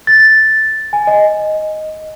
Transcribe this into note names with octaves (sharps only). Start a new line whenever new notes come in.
A6
G#5
D#5